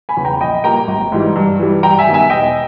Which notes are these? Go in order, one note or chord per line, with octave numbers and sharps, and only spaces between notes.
G#5 B5
E2 C#3
G5 A#5
A#1 D#5 G5
A#2 G3 A#3 G5 A#5
G#1
G#2 E3 G3
G2
E3 G3
G2 G5 A#5
E5 G#5
D#3 G3 B3
E5 G#5
E1 D#5 G5